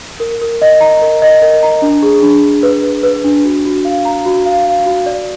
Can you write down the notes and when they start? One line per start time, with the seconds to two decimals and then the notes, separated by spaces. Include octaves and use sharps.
0.20 A#4
0.41 A#4
0.62 D#5
0.81 A#5
1.02 A#4
1.22 D#5
1.42 A#4
1.63 A#5
1.82 D4
2.03 G#4
2.22 D4
2.43 D4
2.63 B4
2.83 B4
3.03 B4
3.24 D4
3.45 F#4
3.65 F#4
3.85 F5
4.05 A#5
4.26 F#4
4.46 F5
4.65 F5
4.86 F#4
5.06 D5